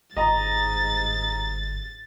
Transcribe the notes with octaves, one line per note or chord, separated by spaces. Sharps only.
G1 G#2 D#5 A#5 A6